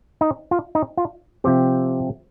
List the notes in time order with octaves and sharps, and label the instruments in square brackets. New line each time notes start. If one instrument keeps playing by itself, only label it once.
[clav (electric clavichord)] D#4
F4
D#4
F4
C3 F3 C4 G4